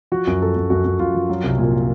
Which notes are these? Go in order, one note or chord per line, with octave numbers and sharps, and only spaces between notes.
F3 F#4
F#2
F3 A4
F#2
F#2 F#4
F#2
F#2 F4
F3
F#3
C2
A#2